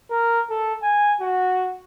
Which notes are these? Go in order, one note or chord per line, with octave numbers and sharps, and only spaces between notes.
A#4
A4
G#5
F#4